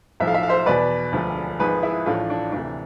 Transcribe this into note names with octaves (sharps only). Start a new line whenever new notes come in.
B1 A2 F3 E5
F5
E5
F5
C5 E5
E2 B2 B4 D5
E1 D2 D3 F3
G#1 G#2 F3 G#4 B4
E4 G#4
A1 A2 F3 D4 F4
D4
D2 C3 E3 D4